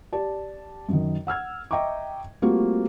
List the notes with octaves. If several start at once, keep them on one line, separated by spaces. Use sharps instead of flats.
G4 D5 A5
F#2 D#3
F#5 E6 F6 G#6
D#5 E5 G5 A#5 C#6 D6
G3 A3 A#3 C4 F4 F#4